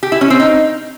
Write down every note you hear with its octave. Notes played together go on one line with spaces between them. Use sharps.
G4
E4
C#4
C4
D#4